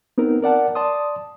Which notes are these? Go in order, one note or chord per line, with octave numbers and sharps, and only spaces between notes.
B3 C4 D#4 A#4
A#4 D5 F#5 A5
D5 A5 C6 D#6